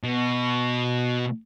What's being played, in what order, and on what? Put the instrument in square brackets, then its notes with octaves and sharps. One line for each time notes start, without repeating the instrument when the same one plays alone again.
[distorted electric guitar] B2